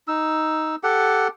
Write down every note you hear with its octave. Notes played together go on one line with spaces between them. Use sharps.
D#4 E6
G4 A4 F#5